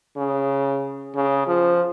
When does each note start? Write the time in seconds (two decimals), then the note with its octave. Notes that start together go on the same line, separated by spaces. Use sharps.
0.17 C#3
1.15 C#3
1.47 F3